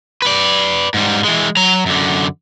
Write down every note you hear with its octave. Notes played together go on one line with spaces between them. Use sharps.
B4 D5
G#2 G3
E3 G#3
F#3 A#5
F#2 D3